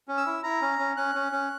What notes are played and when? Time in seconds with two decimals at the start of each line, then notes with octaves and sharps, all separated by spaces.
0.08 C#4
0.17 E6
0.26 E4
0.43 E4 A#5
0.61 C#4
0.79 C#4
0.97 C#4 F#6
1.15 C#4
1.32 C#4